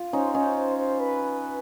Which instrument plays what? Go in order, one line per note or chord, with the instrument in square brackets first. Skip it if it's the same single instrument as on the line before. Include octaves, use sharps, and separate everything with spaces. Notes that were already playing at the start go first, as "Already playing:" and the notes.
Already playing: [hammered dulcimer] F4
[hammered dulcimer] C#4 D#4 [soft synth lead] C5
[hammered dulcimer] C#4 D#4 [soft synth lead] C5
[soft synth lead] C5
C5
B4